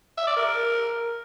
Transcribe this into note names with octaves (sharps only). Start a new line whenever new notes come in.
E5
D5
A#4